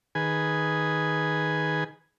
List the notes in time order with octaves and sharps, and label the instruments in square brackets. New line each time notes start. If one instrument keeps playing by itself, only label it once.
[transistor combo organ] D#3 G#4 B4 G#5